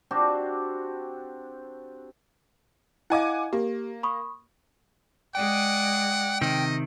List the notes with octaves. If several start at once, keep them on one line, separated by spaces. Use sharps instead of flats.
C4 D4 F#4 G4
E4 D#5 F5 F#5 G#5 D6
A#3 G4
B5 C#6 D#6
G#3 D5 F#5 G5
C3 D#3 D#5